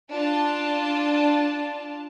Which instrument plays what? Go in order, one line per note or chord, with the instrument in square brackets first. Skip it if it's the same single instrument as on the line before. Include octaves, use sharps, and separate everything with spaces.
[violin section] D4 F4 A5